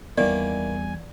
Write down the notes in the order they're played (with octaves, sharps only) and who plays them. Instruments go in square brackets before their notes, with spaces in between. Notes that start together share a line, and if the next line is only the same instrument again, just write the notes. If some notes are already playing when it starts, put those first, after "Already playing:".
[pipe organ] E2 G#5 [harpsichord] D#3 E3 A#3 [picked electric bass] G3 B3 [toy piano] D5